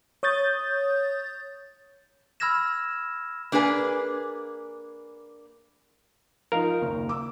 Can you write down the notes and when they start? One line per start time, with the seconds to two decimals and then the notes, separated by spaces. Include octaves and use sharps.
0.23 C#5 D#6 G6 A6
2.40 B5 E6 F6 G#6 A#6 E7
3.52 A#3 D4 G#4 B4 G#5
6.52 F3 D#4 A#4 F5
6.82 F#1 D#2
7.09 D6 E6